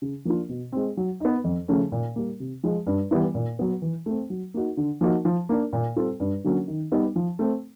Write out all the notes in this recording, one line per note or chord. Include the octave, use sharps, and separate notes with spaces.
C#3
F3 A#3 D4 F4
B2
G#3 C4
F#3
B3 D#4
F2
C#3 F3 A3 C#4
A#2
G3 A#3
C3
F3 G#3
G2
E3 G3 B3 E4
A#2
F#3 B3
E3
A3 C4
F#3
A#3 D#4 F#4
D3
F3 A#3 D#4 F#4
F3
A#3 D4
A#2
G3 C4 F4 A4
G2
D3 F#3 A#3 C#4
D#3
G3 B3 D#4
F3
A3 C4